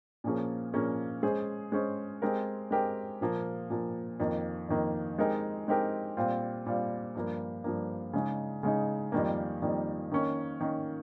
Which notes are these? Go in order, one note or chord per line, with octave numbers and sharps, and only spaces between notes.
A#2 F3 A#3 C#4 G#4
A#2 F3 A#3 C#4 G#4
G#3 C#4 G#4 C5
G#3 C#4 G#4 C5
G#3 C4 G4 A#4
G#3 C4 G4 A#4
A#2 F3 A#3
A#2 F3 A#3
F2 D#3 A#3
F2 D#3 A#3
G#3 C4 D#4 G4 A#4
G#3 C4 D#4 G4 A#4
A#2 G3 C4 F4
A#2 G3 C4 F4
G2 F3 A#3
G2 F3 A#3
C#3 G#3 D#4
C#3 G#3 D#4
F2 D#3 G3 A#3
F2 D#3 G3 A#3
D#3 A#3 C#4
D#3 A#3 C#4